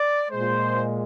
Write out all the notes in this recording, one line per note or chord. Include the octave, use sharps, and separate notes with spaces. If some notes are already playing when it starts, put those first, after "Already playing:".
Already playing: D5
A#2 G#3 C5